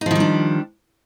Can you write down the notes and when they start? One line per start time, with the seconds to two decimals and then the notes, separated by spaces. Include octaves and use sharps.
0.01 D#4
0.06 F3
0.11 D#3
0.15 G3
0.20 D4